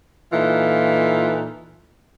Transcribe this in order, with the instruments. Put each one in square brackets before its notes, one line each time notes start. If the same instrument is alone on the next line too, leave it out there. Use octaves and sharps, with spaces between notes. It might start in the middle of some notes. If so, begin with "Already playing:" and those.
[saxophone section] A#2 E3 D#4 F4 A4